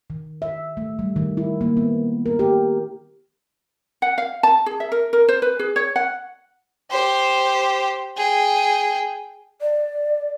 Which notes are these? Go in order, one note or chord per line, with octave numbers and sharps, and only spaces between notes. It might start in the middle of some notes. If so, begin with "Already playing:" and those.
D#3
E5
A3
G3
D#3
E4
A#3
B3
A#4
G4
F#5
F5
A5
G#4
E5
A#4
A#4
C5
B4
G#4
C#5
F#5
G4 C5
G#4 G5
D5